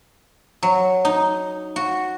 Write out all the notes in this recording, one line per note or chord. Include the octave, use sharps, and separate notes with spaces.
F#3
D#4
F#4